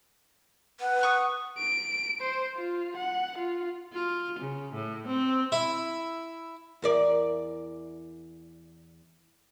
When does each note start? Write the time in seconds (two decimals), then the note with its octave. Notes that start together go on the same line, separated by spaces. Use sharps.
0.80 B4 F#5
1.03 C#6 D#6
1.58 D7
2.21 C5
2.56 F4
2.97 F#5
3.38 F4
3.93 F4
4.39 C#3
4.74 A2
5.07 C4
5.52 E4
6.82 E2 A#4 D5